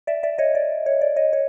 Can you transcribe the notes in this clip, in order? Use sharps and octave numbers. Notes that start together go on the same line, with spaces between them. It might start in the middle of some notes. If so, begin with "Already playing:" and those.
D5 E5
D5 E5
C#5 D#5
D5
C#5
D5
C#5 D#5
C#5